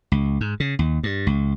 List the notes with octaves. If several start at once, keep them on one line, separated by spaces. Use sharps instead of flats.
C#2
G#2
C#3
D#2
G2
C#2